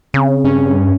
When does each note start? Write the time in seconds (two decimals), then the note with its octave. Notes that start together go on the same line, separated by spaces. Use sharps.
0.14 C#3 C4
0.44 G2 C#4